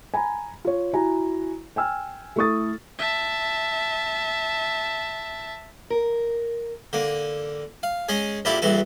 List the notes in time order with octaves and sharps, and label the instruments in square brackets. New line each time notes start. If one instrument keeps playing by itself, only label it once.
[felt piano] G#5 A#5 B5
F4 C#5
E4 F#4 G#5 A#5
G5 G#5 E6 F6
A3 E4 A4 C#6 D#6 A6
[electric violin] E5 A5
[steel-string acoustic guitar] A#4
[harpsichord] D3 A#3
F5
G#3 C#4 G#4
A#1 A#3 E4 G4 A4
A#1 G2 E3 A4